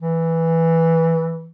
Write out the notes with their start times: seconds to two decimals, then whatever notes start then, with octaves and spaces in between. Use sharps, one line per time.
0.01 E3